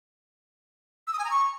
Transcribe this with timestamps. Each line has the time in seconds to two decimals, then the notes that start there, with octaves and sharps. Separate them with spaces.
1.07 E6
1.13 D#6
1.19 G#5
1.25 A#5
1.31 C#6